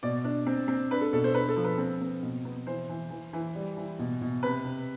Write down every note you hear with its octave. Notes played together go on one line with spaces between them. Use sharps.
B2 D5
D4
C4
C4
D4 B4
A4
B2 A4
C5
D4 B4
A4
F3
B4
C4
C4
B2
B3
E3 C5
E3
E3
E3
G3
E3
B2
B2
C3 B4
C3